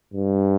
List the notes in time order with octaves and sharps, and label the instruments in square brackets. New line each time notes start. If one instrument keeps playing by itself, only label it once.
[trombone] G2